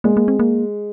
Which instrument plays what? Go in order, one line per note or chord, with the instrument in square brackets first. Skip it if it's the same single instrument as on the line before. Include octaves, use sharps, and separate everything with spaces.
[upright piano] G#3 [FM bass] A#3
[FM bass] A#3
C4
A#3